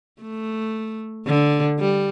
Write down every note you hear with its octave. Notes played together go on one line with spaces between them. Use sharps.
A3
D3
G3